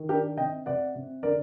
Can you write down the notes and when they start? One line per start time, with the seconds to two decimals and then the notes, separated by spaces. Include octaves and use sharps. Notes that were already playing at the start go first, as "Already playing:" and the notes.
Already playing: D#3
0.09 D4 G4 A#4
0.37 C3 D#5 G5
0.66 C3 D5 F#5
0.95 C3
1.23 D3 A#4 D5